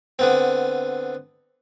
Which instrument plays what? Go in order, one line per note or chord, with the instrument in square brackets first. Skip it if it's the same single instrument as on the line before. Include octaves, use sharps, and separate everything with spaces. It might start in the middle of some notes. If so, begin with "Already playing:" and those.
[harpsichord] D3 B3 C4